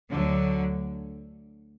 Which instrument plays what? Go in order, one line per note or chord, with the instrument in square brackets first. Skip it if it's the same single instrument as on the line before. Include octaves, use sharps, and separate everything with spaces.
[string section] D2 D3 F#3